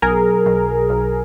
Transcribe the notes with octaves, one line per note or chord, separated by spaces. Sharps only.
B1 G#4 A#4
B1
B1